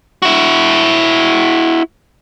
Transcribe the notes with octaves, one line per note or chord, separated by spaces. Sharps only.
E4 F#4